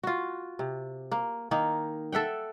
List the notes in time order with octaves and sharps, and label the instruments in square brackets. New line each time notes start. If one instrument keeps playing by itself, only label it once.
[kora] F4 F#4
C3
A#3
D#3 A#3 D#4
A4 E5 F#5 G5